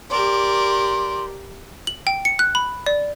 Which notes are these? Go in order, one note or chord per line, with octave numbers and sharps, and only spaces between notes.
G4 A#4 D5 C6
F#7
G5
C#7
F#6
B5
D5